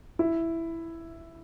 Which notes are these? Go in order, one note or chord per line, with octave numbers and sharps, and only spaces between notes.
E4